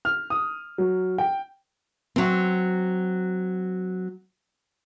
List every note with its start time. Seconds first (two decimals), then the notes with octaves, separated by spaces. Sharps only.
0.05 F6
0.30 D#6
0.78 F#3
1.18 G5
2.16 F#3 C4